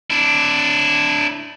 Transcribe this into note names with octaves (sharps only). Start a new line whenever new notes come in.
D4 E4